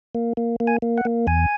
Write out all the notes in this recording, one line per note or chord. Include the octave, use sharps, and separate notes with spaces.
A#3
A#3
A#3
G#5
A#3
F#5
A#3
E2 G#5